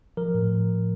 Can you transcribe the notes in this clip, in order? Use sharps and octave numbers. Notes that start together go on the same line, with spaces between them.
F3 A#4
A2